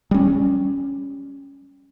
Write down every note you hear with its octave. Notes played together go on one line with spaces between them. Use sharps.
G3 C#4